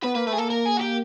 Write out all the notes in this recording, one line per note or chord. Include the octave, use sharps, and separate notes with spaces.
B3 B4
A#3 B4
A3 B4
G#4
A#3 A4
A#4
G#4
F#4
G4